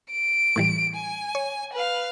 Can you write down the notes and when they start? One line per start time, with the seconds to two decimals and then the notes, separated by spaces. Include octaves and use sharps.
0.11 D7
0.56 A2 E3 G3
0.95 G#5
1.35 C#5
1.73 B4 F5